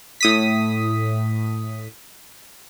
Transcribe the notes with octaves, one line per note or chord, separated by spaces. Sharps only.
A2 D#6 B6